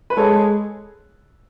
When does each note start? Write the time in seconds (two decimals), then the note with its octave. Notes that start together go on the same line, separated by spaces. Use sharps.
0.10 B4
0.17 G#3 A4 C#5